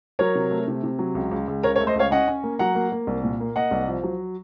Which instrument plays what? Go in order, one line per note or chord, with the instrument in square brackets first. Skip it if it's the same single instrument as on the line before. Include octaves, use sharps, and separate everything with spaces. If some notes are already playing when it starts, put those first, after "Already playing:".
[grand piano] F#3 A#4 C#5
C3
A3
C3
C3
F#3
C#2
C#2
C#2
C#2 A#4 C#5
A#4 C#5
A3
C5 D#5
C#2 C#5 F5
C#4 D#5 F#5
C#4
A#3
F#3 F#5 A#5
A#3
A#3
C2
A#2
A#3
A#3 D#5 F#5
C2
F3
F#3